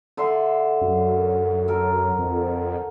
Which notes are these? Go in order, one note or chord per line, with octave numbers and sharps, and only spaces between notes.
D3 E5 C6
F#2
A4 A#4
F2